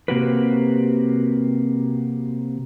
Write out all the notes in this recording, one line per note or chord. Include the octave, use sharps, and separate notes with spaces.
C3 A#3 C4 F#4 G4 B4